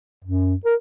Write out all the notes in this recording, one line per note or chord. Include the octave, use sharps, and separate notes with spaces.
F#2
A#4